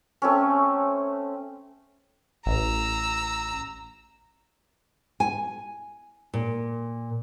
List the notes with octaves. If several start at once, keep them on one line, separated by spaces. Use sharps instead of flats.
A3 C4 C#4
A1 A#5 E6
G#5
A#2